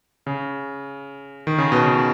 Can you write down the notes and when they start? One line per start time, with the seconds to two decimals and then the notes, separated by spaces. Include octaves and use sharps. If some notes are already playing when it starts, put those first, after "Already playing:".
0.27 C#3
1.47 D#3
1.58 C#3
1.72 B2
1.84 C#3